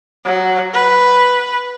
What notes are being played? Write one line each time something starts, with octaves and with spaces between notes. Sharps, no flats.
F#3
B4